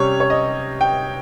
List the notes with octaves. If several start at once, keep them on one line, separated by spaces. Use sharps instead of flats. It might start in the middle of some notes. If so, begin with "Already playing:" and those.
Already playing: C3 G3 C#4 C#5
C#5
D#5
G5